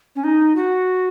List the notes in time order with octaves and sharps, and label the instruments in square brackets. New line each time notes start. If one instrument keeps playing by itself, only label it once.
[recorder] C#4
D#4
F#4